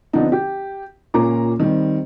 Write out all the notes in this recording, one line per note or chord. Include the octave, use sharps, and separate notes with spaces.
D3 F3 B3 C4 D4 D#4
G4
C#2 A#2 A#3 C#4 A#5 D6
D#3 G3 C4